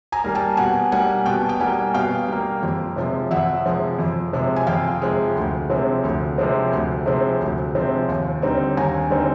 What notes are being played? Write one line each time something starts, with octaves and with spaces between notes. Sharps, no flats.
G#5 A#5
G3 A#3
G5 A5
B2 F#5 G#5
G3 A#3 F#5 G#5
B2 G5 A5
G5
G3 A#3 F#5 G#5
B2 F5 G5
G3 A#3
F2
C3 F3 G#3
F2 E5 F#5
C3 F3 G#3
F2
C3 F3 G#3
G#5
F2 F5 G5
C3 F3 G#3
D2
C3 F3 G#3 C4
D2
C3 F3 G#3 C4
D2
C3 F3 G#3 C4
D2
C3 F3 G#3 C4
D#2
D3 G3 C4 D#4
D#2 G#5 A#5
D3 G3 C4 D#4